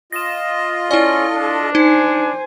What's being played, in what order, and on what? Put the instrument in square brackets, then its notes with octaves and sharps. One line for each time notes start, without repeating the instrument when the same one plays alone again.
[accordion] F4 D#5 [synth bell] A#6 E7
[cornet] C#4 [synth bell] E4 D5 [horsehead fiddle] A4
[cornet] D4
[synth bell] D#4 [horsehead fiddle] C5 G#5